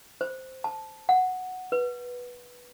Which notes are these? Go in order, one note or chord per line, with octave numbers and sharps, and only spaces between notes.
C5
A5
F#5
B4